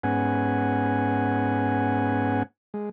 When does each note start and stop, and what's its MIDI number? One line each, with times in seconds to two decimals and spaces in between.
0.03 2.43 44
0.03 2.43 59
0.03 2.43 61
0.03 2.43 78
0.03 2.43 80
2.74 2.89 56